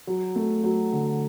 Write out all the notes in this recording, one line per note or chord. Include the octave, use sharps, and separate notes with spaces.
F#3
A3
F#3
D3